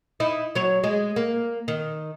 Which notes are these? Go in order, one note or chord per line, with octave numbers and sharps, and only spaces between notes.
D#4 E4
F#3 C#5
G#3
A#3
D#3